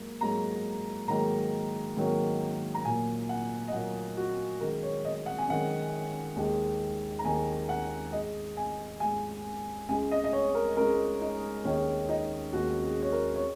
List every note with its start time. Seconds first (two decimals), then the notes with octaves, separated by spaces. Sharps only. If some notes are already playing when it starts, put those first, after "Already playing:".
Already playing: G#2 F#3 A#3
0.21 G#2 F#3 A#3 A#5
1.08 G#2 D#3 F#3 A#3 A#5
1.97 G#2 D#3 F#3 A#3
2.74 A#5
2.85 A#2 F#3 A#3 G#5
3.29 F#5
3.68 D#5
3.72 A#2 F#3 A#3 F#5
4.17 F#4
4.60 F#2 D#3 G#3 A#4
4.83 C#5
5.05 D#5
5.26 F#5
5.38 G#5
5.48 F#2 D#3 G#3 F#5
6.36 D#2 D#3 G#3
7.19 A#5
7.25 D#2 D#3 G#3 G#5
7.69 F#5
8.12 G#2 G#3 D#5
8.57 G#5
9.00 G#2 G#3 G#5
9.89 C#2 C#3 G#3 G#5
10.11 D#5
10.24 D#5
10.33 C#5
10.55 A#4
10.77 C#2 C#3 G#3 A#4
11.21 D#4
11.64 D#2 D#3 G#3 C#4
12.09 D#4
12.53 D#2 D#3 G#3 F#4
12.83 G#4
13.02 C#5
13.12 A#4
13.35 C#5